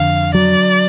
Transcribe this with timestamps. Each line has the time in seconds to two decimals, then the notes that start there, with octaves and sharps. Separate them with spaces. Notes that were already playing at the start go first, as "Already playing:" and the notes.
Already playing: F2 D3 F5
0.34 F#3 D5